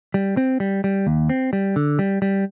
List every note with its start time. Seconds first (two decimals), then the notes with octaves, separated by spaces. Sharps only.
0.14 G3
0.37 C4
0.60 G3
0.84 G3
1.07 D#2
1.29 C4
1.53 G3
1.76 D3
1.99 G3
2.22 G3